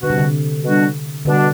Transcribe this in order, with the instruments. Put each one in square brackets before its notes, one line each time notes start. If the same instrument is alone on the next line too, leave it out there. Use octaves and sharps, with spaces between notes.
[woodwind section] B2 G3 D4 F#4 [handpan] D3
[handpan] C3
D3
[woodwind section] B2 G3 D4 F#4
[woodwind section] B2 G3 D4 F#4 [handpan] D3